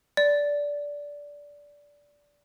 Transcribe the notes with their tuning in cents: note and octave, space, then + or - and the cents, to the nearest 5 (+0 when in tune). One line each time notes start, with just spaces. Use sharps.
D5 -15